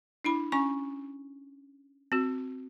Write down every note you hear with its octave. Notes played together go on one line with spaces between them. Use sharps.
D4 E4 B5
C#4 G#5 C#6
C4 F#4